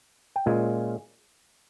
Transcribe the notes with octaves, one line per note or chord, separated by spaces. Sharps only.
G5
A#2 G#3 C#4 F4 G#5